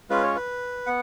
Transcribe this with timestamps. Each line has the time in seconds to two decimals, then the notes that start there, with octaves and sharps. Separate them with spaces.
0.10 G#3 C#4 F4 B4
0.23 C#5
0.36 B4
0.86 B3 F#5